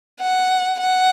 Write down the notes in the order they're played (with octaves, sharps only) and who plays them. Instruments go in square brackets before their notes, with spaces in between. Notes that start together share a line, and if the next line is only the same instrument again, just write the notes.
[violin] F#5
F#5